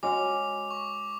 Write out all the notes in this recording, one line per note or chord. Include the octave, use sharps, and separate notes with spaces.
G#3 C#4 F#4 D6
C#6